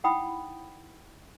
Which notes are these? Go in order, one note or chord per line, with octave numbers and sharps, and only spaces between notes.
D#4 E4 F#5 G5 B5 D#6